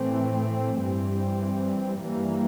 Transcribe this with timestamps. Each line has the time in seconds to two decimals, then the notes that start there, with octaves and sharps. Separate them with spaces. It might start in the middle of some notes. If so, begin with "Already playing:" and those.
Already playing: A2 E3 A3 C4
0.80 G2 E3 G3 C4
2.02 G2 E3 G3 A#3